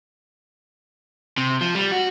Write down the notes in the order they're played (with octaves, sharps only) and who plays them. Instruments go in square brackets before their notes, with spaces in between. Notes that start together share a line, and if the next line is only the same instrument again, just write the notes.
[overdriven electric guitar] C3
F3
G3
F#4